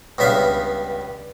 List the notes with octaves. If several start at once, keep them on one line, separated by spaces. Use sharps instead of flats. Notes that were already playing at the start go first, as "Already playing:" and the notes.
C#2 G2 B3 E5 F5